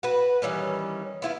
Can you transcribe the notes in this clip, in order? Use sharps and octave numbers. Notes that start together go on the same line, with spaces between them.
F#4 B4
D#3 E3 G3 C#4
B3 E4 F4